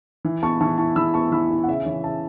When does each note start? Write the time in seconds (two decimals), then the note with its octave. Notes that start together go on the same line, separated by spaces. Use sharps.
0.25 E3
0.43 B3 A5 C#6
0.60 E3 A5 C#6
0.78 E4 A5 C#6
0.96 E3 B5 E6
1.14 B3 A5 C#6
1.32 E3 B5 E6
1.51 E4
1.63 F#5
1.68 C#3 E5
1.86 E3 C#5
2.04 C#3 E5 A5